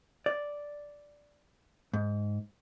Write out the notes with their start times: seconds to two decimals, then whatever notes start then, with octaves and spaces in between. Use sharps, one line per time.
0.26 D5
1.93 G#2